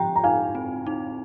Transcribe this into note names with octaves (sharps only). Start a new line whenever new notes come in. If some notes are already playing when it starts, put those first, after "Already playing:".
Already playing: F3 G4 G5 A#5
A#5
D#4 F5 G#5
C4
D#4